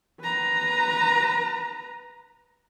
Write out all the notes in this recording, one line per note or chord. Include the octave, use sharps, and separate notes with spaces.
B4 A#5